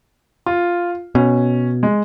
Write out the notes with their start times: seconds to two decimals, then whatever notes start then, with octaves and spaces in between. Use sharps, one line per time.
0.46 F4
1.15 B2 C#4
1.83 G#3